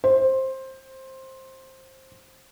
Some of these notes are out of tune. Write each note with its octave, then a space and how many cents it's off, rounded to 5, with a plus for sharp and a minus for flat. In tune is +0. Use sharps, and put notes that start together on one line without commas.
C5 +15